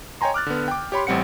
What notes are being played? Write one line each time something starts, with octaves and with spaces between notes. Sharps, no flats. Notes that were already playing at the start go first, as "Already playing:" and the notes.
C#5 D#5 G5 G#5 A#5 C6
D6 F6 F#6 A6
D3 B3
G5 D6
G4 C#5 B5 C6
A1 G3 C4 F#5 C#7